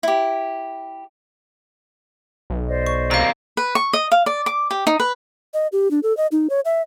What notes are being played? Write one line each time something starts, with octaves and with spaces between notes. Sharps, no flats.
E4 G4
B1
C5 D5 D#5
C#6
C3 A#3 F5 A#5
B4
C#6
D#5
F5
D5
D6
G4
D#4
B4
D#5
G4
D4
A4
D#5
D#4
C#5
E5